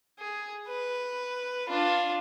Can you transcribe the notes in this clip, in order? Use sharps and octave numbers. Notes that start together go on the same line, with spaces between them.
G#4
B4
D4 F4